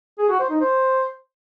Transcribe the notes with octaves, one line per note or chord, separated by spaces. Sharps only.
G#4
F#4
C5
D#4
C5